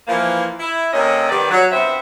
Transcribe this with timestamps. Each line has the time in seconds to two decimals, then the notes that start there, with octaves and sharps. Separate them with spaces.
0.08 E3 F3 A#3
0.60 E4
0.92 C3 A#3 C#4 A4 C#5 D#5
1.30 D#3 G3 B3 G4 B4 D5
1.50 F#3
1.72 G2 B3 C4 C5 E5